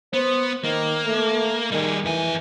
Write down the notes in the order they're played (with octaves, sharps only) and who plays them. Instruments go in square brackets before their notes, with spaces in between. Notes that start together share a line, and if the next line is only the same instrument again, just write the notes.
[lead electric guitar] B3 [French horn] C5
[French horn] D#3 [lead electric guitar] A#3
[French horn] A3
[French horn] D#3 [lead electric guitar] G3 G#4
[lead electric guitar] F2 G#5 [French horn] E3